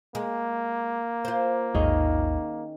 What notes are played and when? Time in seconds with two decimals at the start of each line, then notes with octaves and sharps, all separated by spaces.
0.15 G#3 A#3
1.25 F4 C5
1.75 A1 D#2 G#2 D#3 C#4 G#4